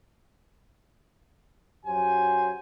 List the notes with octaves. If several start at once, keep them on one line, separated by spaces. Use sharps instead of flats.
F#2 F#3 G4 C5 G#5